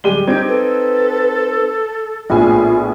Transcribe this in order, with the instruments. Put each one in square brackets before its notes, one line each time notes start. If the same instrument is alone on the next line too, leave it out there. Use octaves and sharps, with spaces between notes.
[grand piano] D1 D#7 G7 [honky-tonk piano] G3 G#3 G4
[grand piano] C4 D#4 [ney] G4 [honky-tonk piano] G#6 D7
[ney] A4 [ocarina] B4
[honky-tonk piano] A#1 A2 G#5 [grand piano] B3 D4 G#4 [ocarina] F4